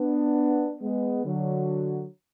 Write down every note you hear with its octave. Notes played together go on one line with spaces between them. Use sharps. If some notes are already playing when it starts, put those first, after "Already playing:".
Already playing: B3 D4
G#3 B3
D3 F#3